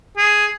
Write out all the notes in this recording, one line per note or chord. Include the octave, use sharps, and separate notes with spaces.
G#4